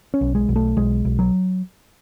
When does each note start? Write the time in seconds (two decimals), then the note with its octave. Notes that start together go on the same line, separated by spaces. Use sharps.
0.14 C#4
0.21 B1
0.35 G#3
0.49 B1
0.56 A3
0.77 B1 G#3
1.05 B1
1.19 F#3